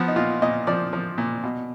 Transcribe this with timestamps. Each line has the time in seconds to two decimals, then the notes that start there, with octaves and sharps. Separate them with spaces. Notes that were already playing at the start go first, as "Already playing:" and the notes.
Already playing: F3 B3
0.08 D#4
0.16 A#2 F4
0.42 A#2 D#5
0.67 F3 D5
0.93 F3
1.18 A#2
1.43 B2